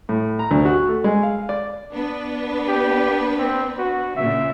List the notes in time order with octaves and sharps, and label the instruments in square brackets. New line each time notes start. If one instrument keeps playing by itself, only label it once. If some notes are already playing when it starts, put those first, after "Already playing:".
[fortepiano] A2
A#5
D2
F#4
A3
G#3
F5
D5
[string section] B3 D4 B4
[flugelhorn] G4
C4
F#4
[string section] A#2 C#3 [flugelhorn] E5